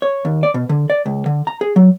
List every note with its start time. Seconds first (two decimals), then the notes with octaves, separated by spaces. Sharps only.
0.02 C#5
0.25 D#2
0.43 D5
0.54 B2
0.69 D3
0.90 D5
1.06 C#2
1.26 D3
1.47 A#5
1.61 G#4
1.76 F#3